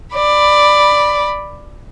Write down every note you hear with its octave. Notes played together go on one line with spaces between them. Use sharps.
D5 B5